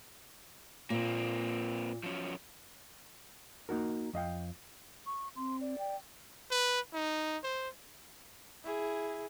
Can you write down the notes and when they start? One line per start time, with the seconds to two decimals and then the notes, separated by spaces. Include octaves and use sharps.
0.90 A#2 A#3 C4
2.03 F3 F#3 C#4
3.69 A#3 D#4 F#4 A#4
4.13 F2 D#5 F5 G5
5.06 C#6
5.36 C4 C6
5.61 D5
5.79 G5
6.51 B4
6.94 D#4
7.43 C5
8.64 E4 G#4